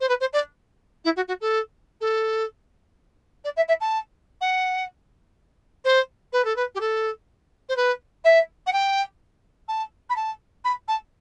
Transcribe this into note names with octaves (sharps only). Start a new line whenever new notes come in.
C5
B4
C5
D5
E4
F#4
F#4
A4
A4
D5
E5
E5
A5
F#5
C5
B4
A4
B4
G4
A4
C5
B4
E5
F#5
G5
A5
B5
A5
B5
A5